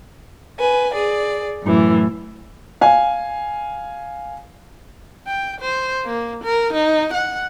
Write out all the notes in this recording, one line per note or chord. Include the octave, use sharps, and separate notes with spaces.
B4 G#5
G#4 D5
F#2 A2 E3
F5 G#5
G5
C5
A#3
A#4
D#4
F#5